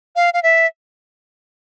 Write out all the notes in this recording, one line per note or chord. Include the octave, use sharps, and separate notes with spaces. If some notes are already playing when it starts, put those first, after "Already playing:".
F5
F5
E5